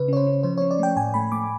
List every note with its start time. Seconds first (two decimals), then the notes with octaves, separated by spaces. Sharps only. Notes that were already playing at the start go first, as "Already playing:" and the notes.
Already playing: C#3 B4
0.08 C#4 C#5
0.17 C5
0.27 C#4
0.43 F3 C5
0.58 C#4 C#5
0.71 D5
0.79 A3 G5
0.96 A2 G#5
1.14 A3 B5
1.32 A3 D6